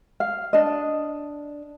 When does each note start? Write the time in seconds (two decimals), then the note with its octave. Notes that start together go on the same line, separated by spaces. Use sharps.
0.20 F5
0.53 D4 D#5